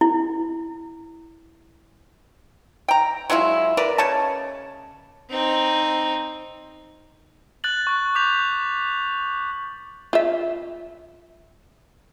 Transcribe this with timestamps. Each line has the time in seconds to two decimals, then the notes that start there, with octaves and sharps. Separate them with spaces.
0.01 E4
2.88 G5 A#5
3.30 F#3 G#3 E4 F4
3.77 A#4 B4 D5
3.98 C#3 C#5 D#5 A5
5.30 C4 D#4
7.64 F#6 A6 F#7
7.87 C#6 F#6
8.15 D6 G6 B6 F7
10.13 F4 E5